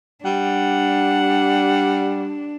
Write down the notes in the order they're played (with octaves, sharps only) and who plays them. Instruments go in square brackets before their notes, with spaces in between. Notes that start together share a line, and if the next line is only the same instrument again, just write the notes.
[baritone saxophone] G3 [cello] D4 [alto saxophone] F#5